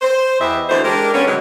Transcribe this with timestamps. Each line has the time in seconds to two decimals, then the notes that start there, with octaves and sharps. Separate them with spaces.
0.02 C5
0.40 E2 E3 G4 B4 D#5 E5
0.69 D2 D3 E3 B3 C5
0.84 G#3 D4 G4 A#4
1.14 D3 A#3 B3 C#4
1.27 G#2 B2 D#3 F#3 G#3